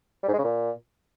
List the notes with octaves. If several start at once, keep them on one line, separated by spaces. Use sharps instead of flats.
G3
G#2
G#3
C#3
A#2